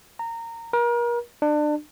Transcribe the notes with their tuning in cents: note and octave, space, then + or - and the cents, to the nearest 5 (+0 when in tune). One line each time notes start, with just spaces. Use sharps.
A#5 -20
A#4 +35
D4 +30